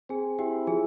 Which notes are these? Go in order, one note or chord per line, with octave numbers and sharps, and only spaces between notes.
C4 G#4 G#5
E4 G4 G5
F3 G#4 G#5